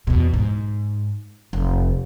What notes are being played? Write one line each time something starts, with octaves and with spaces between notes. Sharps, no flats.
E2 B2
G#2
F1